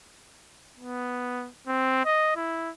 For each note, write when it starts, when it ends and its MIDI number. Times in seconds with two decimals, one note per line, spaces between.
0.78 1.49 59
1.67 2.04 60
2.05 2.32 75
2.36 2.70 64